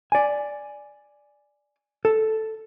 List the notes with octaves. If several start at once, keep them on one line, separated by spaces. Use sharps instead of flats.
D5 G#5
A4